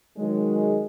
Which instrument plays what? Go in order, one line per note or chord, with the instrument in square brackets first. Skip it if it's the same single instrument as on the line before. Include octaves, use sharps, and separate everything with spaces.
[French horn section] D#3 F#3 G#3